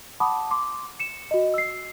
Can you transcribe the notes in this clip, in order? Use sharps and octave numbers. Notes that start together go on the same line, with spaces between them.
F#5 A5 B5 D6 D#6
C6 D6
C#7 E7
F#4 D#5
E6 C7